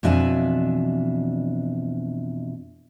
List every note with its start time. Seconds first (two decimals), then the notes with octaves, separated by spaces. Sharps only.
0.03 F2 B2 E3 D4 E5 G#5